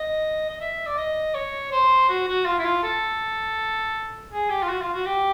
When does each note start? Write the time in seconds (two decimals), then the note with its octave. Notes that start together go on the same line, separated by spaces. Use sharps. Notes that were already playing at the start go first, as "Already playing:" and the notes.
Already playing: D#5
0.50 D#5
0.61 E5
0.87 D5
0.98 D#5
1.34 C#5
1.72 C5
2.09 F#4
2.28 F#4
2.46 F4
2.58 E4
2.65 F4
2.83 A4
4.31 G#4
4.50 G4
4.62 F4
4.69 F#4
4.82 F4
4.93 F#4
5.06 G4